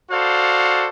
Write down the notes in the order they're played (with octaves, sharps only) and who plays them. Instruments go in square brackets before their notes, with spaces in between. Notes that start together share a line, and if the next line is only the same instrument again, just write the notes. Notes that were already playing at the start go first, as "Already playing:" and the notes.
[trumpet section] F#4 A4 C5 D5 F5